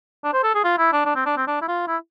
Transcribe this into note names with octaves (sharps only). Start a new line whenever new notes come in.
D4
C5
A4
G#4
F4
E4
D4
D4
C4
D4
C4
D4
E4
F4
E4